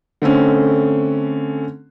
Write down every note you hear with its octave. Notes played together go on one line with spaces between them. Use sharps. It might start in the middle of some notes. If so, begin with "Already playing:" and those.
D3 A3 C4 C#4